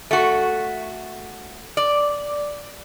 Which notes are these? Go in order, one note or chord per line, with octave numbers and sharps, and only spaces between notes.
A3 F#4
D5